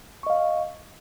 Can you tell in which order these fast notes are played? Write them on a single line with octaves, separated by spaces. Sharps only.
C#6 D#5 F5